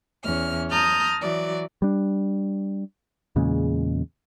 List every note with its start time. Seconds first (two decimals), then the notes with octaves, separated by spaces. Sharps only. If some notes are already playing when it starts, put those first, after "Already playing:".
0.24 E2 C#4 F6
0.71 A5 A#5 D#6 F6 G6
1.22 E3 F#3 D5
1.82 G3 D4
3.36 E2 A#2 C#3 G#3